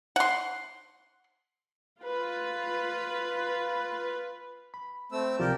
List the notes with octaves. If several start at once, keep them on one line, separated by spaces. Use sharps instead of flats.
F#5 C6
F4 B4
B5
A3 C4 E6
C#2 C3 F3 G4 A#4 D5